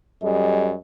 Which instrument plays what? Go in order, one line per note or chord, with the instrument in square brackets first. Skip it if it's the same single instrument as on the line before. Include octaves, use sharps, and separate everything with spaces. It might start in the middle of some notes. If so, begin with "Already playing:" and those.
[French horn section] F#2 G3 G#4 D#5